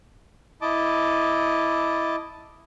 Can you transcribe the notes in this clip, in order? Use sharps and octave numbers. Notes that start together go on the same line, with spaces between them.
E4 D#5 A5 D6